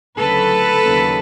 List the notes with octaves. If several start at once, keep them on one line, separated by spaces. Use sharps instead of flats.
D2 C#3 F#3 A4 B4
D#2 C#3 F#3